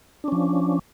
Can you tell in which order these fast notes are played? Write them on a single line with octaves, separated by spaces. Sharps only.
D4 C#4 F3